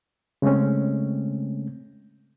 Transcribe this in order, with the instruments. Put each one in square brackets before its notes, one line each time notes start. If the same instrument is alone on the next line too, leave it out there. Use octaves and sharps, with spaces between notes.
[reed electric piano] C#3 G#3 A3 C4 C#4